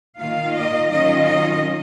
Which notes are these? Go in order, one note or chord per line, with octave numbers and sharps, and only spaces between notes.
D#3 A#3 F4 F5
D#5
D#3 F#3 C#4 F4 D#5
D#5